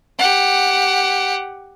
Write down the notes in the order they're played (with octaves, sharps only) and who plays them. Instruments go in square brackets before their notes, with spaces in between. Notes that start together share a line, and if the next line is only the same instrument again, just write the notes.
[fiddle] G4 F#5